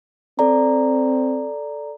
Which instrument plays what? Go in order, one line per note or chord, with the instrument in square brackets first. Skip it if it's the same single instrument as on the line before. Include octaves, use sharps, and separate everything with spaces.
[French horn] C4 [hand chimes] A4 D5 A#5